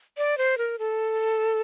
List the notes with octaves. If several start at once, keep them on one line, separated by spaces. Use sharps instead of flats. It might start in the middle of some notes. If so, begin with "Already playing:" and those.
D5
C5
A#4
A4